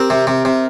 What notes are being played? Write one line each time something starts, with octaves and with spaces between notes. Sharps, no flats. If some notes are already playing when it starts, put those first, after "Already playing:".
Already playing: C4 G4 A#4
C3
C3
C3